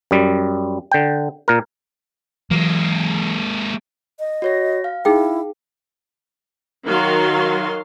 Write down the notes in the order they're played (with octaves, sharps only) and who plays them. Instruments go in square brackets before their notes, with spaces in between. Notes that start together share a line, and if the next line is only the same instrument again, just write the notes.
[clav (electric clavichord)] F#2 G3
D3 G5
A#2 A#4
[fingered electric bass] E3 F#3 [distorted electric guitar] G#3 A#3
[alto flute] D#5
[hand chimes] F#4 C#5 A#6
F5
[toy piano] D#4 G#4 G5 [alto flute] E4
[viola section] D#3 F#3 F#4 F5 C6